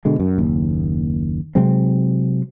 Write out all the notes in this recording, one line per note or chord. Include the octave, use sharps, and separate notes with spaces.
B2 D3 G#3
F#2
F#1 D#2
C3 F#3 G#3 C4